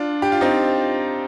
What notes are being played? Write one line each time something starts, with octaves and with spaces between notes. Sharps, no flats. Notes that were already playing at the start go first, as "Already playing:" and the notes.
Already playing: D4 F4
G4
F4
C4 D#4